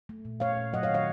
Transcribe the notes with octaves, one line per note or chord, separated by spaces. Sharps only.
A3
A#2
A3 C#5 F5
A#2
F#3 D#5 F#5
C#5 F5
D#3
C#5 F5